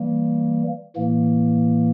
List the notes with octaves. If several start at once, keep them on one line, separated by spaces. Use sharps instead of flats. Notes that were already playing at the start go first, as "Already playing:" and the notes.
Already playing: E3 G3 A#3
A2 E3 A#3